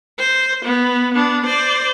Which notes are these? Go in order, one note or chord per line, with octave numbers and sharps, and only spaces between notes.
C5
B3
B3 D4
C5 D5